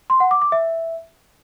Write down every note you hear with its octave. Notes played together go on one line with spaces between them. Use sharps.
C6
F#5
D6
D6
E5